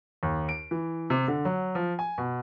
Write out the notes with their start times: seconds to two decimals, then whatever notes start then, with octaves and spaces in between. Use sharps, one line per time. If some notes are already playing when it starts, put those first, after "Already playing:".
0.23 D#2
0.49 D7
0.71 E3
1.10 C3
1.28 D3
1.45 F#3
1.75 F3
1.99 G#5
2.18 B2